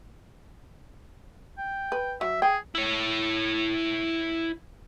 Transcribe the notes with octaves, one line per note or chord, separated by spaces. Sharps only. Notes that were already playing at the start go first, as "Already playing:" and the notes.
G5
B4
F#3 E5
G#4 G5
E4 C#5